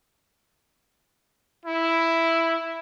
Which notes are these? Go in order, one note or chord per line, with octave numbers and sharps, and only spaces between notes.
E4